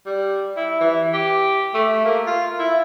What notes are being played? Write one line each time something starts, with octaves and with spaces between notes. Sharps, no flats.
G3
E4
E3
G4
A3
A#3
F4
E4